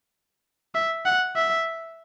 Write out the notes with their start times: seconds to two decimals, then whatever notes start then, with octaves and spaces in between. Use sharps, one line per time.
0.75 E5
1.06 F#5
1.36 E5